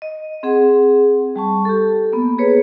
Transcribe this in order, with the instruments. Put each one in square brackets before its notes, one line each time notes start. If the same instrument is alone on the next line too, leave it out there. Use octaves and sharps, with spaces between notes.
[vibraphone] D#5
C4 G#4 F#5
G3 A5 C#6
G4 A4
A#3 B3
G#4 B4 C#5